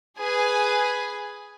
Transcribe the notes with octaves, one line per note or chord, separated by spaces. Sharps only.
G#4 B4 G#5